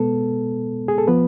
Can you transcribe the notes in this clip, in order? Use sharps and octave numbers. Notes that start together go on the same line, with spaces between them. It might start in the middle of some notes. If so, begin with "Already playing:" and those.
Already playing: B2 G#3 B3 A4
G#4
A4
F3 B3 B4